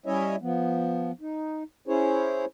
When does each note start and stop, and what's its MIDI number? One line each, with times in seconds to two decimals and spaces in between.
0.06 0.36 55
0.06 0.36 61
0.06 0.36 64
0.06 0.36 73
0.06 0.36 75
0.06 0.36 76
0.42 1.12 53
0.42 1.12 59
1.21 1.63 63
1.88 2.45 61
1.88 2.45 64
1.88 2.45 68
1.88 2.45 72
1.88 2.45 73